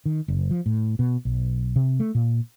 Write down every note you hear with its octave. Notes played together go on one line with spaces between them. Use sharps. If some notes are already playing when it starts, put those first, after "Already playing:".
D#3
F#1
F3
A2
B2
B1
C3
A3
A#2